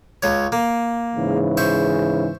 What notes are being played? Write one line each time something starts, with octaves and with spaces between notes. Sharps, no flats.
C#2 C#5
A#3
G#2 C#3 E3
C5 E5 C#6